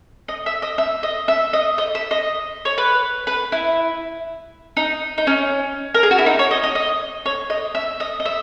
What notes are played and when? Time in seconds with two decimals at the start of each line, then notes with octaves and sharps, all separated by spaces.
0.28 D#5
0.46 E5
0.62 D#5
0.78 E5
1.03 D#5
1.28 E5
1.53 D#5
1.78 D#5
1.95 E5
2.11 D#5
2.65 C#5
2.78 B4
3.27 B4
3.52 E4
4.77 D#4
5.18 D#4
5.27 C#4
5.94 A#4
6.03 G#4
6.11 F#4
6.18 E4
6.26 D#4
6.39 C#5
6.51 D#5
6.63 D#5
6.75 D#5
7.26 C#5
7.50 D#5
7.75 E5
8.00 D#5
8.20 D#5
8.26 E5